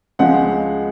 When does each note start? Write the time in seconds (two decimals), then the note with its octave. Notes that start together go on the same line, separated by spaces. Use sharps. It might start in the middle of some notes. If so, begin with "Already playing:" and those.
0.19 C#2 C#3 F3 G#3 F#5